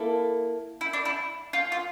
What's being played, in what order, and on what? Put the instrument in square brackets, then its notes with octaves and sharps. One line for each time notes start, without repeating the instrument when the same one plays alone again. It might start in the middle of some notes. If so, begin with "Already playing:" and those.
Already playing: [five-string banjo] A#3 E4 A4
[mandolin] E4
D4
E4
F4
F4